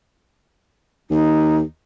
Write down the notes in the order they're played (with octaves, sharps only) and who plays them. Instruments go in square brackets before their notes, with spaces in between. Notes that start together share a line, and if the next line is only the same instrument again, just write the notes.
[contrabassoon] D#2 [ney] D#4